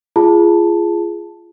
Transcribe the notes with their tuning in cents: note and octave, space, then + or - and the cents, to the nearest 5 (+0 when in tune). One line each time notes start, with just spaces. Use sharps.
F4 -30 G#4 +0 A5 +0